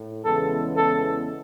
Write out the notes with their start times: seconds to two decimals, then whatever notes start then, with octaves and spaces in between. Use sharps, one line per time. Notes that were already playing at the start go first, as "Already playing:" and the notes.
Already playing: A2
0.25 E2 C#3 E3 G#3 B3 A4
0.77 A4